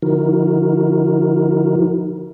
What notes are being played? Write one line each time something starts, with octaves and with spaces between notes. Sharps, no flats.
D3 F3 D#4 E4 F#4 A#4